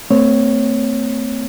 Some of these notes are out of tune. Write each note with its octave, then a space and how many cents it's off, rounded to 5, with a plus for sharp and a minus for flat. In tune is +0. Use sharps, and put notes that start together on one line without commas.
A3 +30 C4 -25 C#5 +0